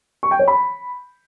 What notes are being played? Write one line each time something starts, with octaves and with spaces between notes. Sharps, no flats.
C#6
G5
C#5
B5